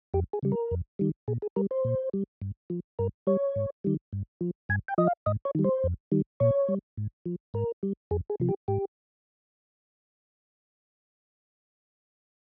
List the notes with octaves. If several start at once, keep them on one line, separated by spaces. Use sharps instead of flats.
F2 G4
G#4
C#3 G3
A#4
F2
D#3 G3
A#2 G#4
G#4
G3 A#4
C5
A#2
G3
G2
F3
G2 A#4
G3 C#5
G#2
D#3 G3
G2
F3
G2 G#5
G5
F3 D#5
F5
G#2 D#5
C#5
D#3 G3
C5
F2
D#3 G3
A#2 C#5
G3
G#2
F3
G#2 A#4
G3
F2 G#4
G#4
C3 F3
G4
G#2 G4